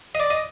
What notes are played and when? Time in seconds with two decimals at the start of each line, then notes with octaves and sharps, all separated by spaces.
0.15 D#5
0.20 D5
0.30 D#5